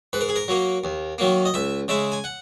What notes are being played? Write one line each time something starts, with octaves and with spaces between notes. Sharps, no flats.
G#2 B4
A#4
G#4
A#4
F#3 A#3
D#2
D#3 F#3 A#3
D#5
C#2 E5
C#3 G#3 E5
G#5
F#5